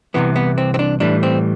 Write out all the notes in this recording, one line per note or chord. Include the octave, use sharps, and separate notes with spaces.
C2 C3 E3 B3
B3
C4
C4
D4
A2 E3 G3 D4
C4